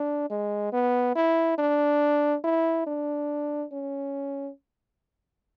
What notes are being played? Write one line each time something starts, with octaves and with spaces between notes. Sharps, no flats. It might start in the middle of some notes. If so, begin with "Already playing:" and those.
Already playing: D4
G#3
B3
E4
D4
E4
D4
C#4